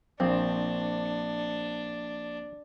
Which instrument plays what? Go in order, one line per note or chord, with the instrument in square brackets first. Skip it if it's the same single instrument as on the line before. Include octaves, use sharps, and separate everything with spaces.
[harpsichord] A#1 [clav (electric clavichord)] C4 [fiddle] D4